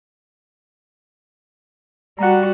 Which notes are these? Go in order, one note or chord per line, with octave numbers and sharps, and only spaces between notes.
G3 F#4 F#5 A#5